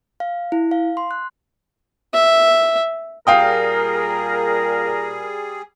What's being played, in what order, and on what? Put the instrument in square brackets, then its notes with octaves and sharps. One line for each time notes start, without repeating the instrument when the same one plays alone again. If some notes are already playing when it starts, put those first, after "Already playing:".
[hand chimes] F5
E4
F5
C6
F#6
[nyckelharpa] E5
[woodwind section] A#2 A#4 [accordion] G3 G#4 [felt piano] F5 G5 D#6